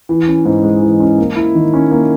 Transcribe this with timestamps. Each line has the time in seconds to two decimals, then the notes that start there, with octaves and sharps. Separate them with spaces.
0.09 E3
0.27 C#4
0.45 G#2
0.63 G#3
0.82 E3
1.00 C#4
1.18 A#3
1.36 E4
1.55 D#3
1.74 C#4
1.91 A#3